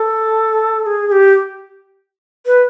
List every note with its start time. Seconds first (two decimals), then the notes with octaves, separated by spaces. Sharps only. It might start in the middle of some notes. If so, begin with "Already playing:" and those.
Already playing: A4
0.82 A4
0.86 G#4
1.07 G#4
1.12 G4
2.46 B4